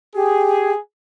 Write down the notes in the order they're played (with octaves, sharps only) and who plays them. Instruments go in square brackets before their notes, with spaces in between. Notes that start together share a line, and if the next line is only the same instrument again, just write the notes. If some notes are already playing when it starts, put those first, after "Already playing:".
[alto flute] G4 [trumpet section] G#4